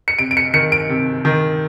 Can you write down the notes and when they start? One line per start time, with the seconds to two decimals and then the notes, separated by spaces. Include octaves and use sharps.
0.08 C#7
0.19 C3 D7
0.31 D7
0.37 C#7
0.54 D#3 C#7
0.72 D7
0.89 C3
1.25 D#3